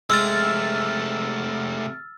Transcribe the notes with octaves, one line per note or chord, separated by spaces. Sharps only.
C3 G#3 A3 E6 F6 A6